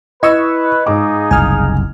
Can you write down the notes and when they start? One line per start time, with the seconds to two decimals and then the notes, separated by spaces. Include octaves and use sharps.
0.23 E4 B4 D#5 C#6 E6 G#6
0.86 G#2 D#4 F4 G#4 D6
1.31 F#1 C2 G#5 F6